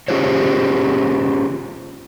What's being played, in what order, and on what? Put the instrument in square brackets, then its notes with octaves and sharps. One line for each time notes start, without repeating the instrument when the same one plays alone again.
[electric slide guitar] C#4 F4 G4 G#4 C5 C#5